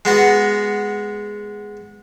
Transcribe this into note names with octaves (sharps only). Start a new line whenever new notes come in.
G#3 B3 F#4